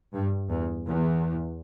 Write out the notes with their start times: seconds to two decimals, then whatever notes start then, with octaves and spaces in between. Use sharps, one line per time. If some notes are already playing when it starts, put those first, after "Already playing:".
0.13 G2
0.49 E2
0.87 E2